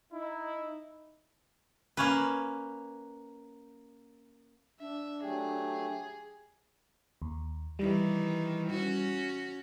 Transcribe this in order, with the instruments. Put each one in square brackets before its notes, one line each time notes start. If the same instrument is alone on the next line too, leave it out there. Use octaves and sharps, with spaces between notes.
[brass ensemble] D#4 E4
[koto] A#3 C#4 B4
[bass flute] D4 [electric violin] E5
[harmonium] F#3 A3 [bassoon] G4 [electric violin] G#4
[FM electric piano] D#2
[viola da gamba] D#3 E3 [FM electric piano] G3
[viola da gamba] C#4 F#4